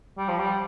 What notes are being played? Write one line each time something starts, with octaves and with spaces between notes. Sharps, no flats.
G3
F3
G3